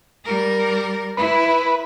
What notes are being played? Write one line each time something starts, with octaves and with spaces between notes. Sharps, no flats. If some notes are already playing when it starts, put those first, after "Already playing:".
G3 A#4
E4 B4